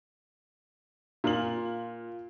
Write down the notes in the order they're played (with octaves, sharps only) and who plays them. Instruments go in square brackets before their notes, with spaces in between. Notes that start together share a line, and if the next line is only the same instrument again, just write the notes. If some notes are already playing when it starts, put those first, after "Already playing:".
[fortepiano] A#2 [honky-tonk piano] F4 F6 F#7